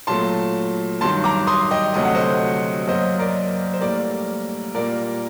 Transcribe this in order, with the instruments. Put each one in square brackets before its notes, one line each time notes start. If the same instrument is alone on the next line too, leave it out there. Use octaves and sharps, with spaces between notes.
[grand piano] A#2 F#3 A3 A5 C6
G2 D#3 F#3 A5 C6
A#5 D6
C6 D#6
D#5 G5
D2 C3 F#3 A3 D#5
F#5
C5 D#5
F#2 F#3 A#3 C5 D#5
A#4 D5
C5
A2 G3 A#3 A#4 D5
A#2 G3 A#3 A#4 D5